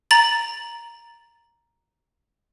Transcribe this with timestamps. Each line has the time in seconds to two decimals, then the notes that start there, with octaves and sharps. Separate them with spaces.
0.11 A#5 A6 F#7